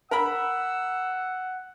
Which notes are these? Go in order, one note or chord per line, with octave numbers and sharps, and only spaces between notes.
A#4 F#5 A#5 B5 E6